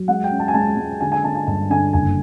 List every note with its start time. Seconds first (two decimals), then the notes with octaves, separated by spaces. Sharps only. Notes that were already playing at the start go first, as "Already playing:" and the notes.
Already playing: F#3
0.08 G#3 F#5
0.24 G5
0.31 C#4
0.40 A5
0.48 G#5
0.54 G#3 A5
0.77 G#3
1.01 D3 G#5
1.12 G#5
1.24 D3 A5
1.35 G#5
1.47 G2 A5
1.70 D3 G#5
1.93 F#1 G#5